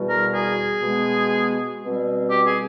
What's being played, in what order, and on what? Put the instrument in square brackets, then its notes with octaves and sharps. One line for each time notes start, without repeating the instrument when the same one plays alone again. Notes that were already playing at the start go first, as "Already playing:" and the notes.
Already playing: [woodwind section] E2 B2 G3
A#4
G#4
B2 G#3 B3
B2 G3 C4
G4
G#4